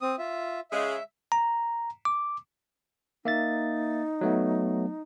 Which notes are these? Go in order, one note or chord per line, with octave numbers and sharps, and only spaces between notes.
C4 D#6
F4 E5
C#3 G#3 E5
A#5
D6
A#3 D#4 E5 A6
F#3 A3 B3